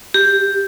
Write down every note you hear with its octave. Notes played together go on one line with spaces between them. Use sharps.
G4